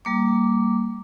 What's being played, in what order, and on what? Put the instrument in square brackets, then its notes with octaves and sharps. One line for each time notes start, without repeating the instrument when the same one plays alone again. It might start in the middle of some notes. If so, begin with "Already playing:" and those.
[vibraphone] G3 A#3 D6